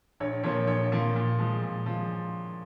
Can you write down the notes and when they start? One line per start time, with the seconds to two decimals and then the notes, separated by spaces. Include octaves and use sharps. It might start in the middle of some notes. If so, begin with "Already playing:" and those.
0.20 A#1 C#5
0.43 A#2 F3 A#3 C#5
0.67 A#1 C#5
0.92 A#2 F3 A#3
1.16 A#2
1.39 F3 G#3
1.63 A#2
1.86 F3 G#3